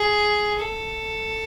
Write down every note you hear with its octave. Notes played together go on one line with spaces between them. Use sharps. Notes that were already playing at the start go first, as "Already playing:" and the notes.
Already playing: G#4
A4